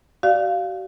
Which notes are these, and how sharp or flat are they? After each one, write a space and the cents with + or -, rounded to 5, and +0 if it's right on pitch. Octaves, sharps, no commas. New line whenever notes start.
F#4 +40 D5 +0 F5 +0